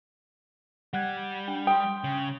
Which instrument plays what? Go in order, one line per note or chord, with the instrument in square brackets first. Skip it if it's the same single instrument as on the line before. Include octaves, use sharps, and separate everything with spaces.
[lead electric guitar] G3 [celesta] F#5 F#6 G#6
[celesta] D4 G5 G7
[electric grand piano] G5 [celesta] C6 D#6
[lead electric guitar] C#3